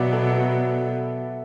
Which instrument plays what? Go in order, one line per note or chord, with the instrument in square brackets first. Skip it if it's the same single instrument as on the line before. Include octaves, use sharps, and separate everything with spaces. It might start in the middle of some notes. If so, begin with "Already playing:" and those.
Already playing: [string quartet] B2 F#3 B3 [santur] D5 E5 F#5
[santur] A4
A4